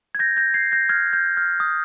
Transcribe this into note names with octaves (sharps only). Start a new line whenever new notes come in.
G#6
G6 A#6
G6 A#6
G#6 C7
G6 A#6
F6 G#6
G6
F6
D#6